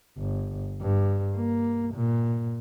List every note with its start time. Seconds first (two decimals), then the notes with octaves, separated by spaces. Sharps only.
0.18 G1
0.81 G2
1.36 A#3
1.94 A#2